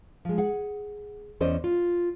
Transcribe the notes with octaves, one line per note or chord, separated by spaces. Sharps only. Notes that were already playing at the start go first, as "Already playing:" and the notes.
F3 G#3
G#4 F#5
E2 C#4 C5 D5 D#5
F4